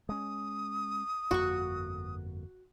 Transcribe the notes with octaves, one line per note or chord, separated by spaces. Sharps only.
G#3 C#4 D#6
G1 F2 A#3 F#4 C#6